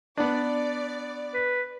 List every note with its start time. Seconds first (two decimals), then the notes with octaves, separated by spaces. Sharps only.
0.17 B3 D4 D5
1.34 B4